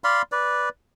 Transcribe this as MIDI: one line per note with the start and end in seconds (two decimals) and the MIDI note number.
0.04 0.22 74
0.04 0.22 77
0.04 0.22 83
0.04 0.22 84
0.32 0.69 71
0.32 0.69 74